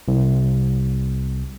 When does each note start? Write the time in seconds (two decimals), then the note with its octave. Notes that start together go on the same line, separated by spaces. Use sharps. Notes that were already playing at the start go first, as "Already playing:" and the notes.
0.08 C2